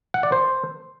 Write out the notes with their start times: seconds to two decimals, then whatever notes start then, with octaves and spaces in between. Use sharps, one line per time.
0.14 F#5
0.23 D5
0.32 C5